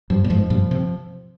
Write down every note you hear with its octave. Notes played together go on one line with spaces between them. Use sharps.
G2 F3
A#2
F2 G#2 F3
G2 A#2
C3